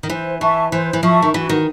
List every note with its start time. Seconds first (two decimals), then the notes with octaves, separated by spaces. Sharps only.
0.03 D#3
0.10 E3 C5
0.41 E3 E5 A5 C#6
0.72 E3 C5
0.93 E3
1.03 F3 E5 A5 C#6
1.22 D#3
1.34 E3 F#4
1.49 D#3